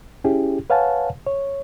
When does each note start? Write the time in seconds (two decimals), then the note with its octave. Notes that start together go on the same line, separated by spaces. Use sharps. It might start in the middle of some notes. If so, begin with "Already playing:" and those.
0.24 C#4 E4 G4 G#4
0.70 B4 C#5 F5 F#5 G#5 A5
1.27 C#5